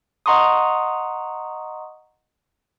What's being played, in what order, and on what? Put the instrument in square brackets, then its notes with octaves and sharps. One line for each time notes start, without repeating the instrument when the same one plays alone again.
[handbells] D#5 F#5 A#5 C6 C#6 D#6